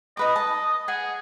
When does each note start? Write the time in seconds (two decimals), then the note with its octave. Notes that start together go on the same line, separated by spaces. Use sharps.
0.17 D#4 B4 D#5 D6
0.36 A5 D#6
0.88 G#4 F#5